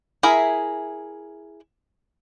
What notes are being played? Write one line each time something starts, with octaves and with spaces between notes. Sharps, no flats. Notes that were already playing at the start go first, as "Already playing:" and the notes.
E4 G#4 A#4 E5